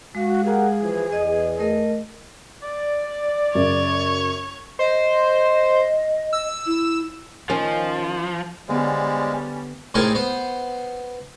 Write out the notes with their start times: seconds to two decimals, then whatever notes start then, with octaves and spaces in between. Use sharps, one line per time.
0.15 G#3 F#4 F5
0.45 G4 G#4 A#4 F#5
0.81 E3 F3
1.13 E2 D#5
1.59 A3 A#4 D#5
2.63 D5
3.55 F#2 C#3 C#5
4.79 C5 D#5
6.33 E6
6.66 E4
7.49 D#3 F3 C#4
8.69 D3 G3 G#3 B3 C#4 C5 D5 F5
9.94 A2 C3 D#4 G#4 A#4 A5
10.15 B3 C5